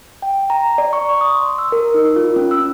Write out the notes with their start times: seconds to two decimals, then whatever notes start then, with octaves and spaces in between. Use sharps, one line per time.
0.22 G5
0.50 A#5
0.78 D5
0.93 C#6
1.21 D#6
1.35 C6
1.58 E6
1.72 A#4
1.94 D#4
2.16 F4
2.36 C#4
2.51 E6